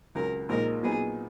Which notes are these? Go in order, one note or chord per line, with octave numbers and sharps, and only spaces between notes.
C#2 C#3 F#3 A#4
A#1 A#2 G#3 D#4 A#4
A#2 F#3 B3 D#4 G#4